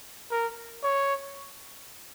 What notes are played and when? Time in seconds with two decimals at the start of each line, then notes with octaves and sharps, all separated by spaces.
0.31 A#4
0.83 C#5